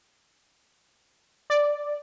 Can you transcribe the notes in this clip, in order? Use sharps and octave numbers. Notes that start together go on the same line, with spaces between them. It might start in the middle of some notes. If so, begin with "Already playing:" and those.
D5